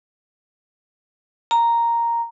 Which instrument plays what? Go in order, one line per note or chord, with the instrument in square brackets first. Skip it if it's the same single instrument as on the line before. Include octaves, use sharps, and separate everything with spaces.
[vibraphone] A#5